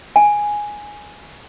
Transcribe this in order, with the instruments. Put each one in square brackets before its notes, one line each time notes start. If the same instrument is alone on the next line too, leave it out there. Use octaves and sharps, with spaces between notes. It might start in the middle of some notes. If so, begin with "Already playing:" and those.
[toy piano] G#5